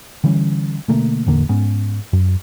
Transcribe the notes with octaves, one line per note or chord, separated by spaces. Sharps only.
D3 E3 G3 C#4
B2 D3 A3 A#3
A1 E2 D3 A#3
G#2 B3 C#4
F#2